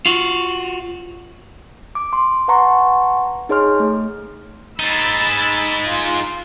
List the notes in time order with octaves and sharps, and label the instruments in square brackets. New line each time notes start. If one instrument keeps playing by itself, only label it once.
[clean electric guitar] F4 F#4
[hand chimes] D6
C6
B4 F#5 A5 A#5 C6 C#6
D#4 G#4 C#5 C6 F6
A3
[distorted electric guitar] G#3 D#4 [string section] B5 E6 A6
[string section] F4